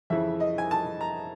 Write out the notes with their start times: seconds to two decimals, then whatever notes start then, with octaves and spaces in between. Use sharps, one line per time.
0.10 F2 C#3 E3 E5
0.40 D#5
0.58 G#5
0.71 A5
1.01 A#5